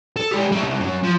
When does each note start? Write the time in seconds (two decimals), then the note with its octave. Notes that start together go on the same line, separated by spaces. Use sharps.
0.16 A4
0.31 G#3 G4
0.52 G3 E5
0.63 C2
0.81 F#2 F#3
1.04 F3